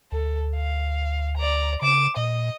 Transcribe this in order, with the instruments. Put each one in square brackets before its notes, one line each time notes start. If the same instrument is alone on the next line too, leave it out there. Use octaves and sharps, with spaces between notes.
[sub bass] D2 [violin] A4
[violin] F5
D5 A#5
[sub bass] C#3 [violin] D6 E7
[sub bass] A#2 [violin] D#5